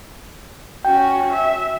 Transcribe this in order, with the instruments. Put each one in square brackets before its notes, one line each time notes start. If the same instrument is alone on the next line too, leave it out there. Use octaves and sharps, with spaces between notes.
[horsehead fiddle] C#4 F#4 [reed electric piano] G5
[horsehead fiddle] E5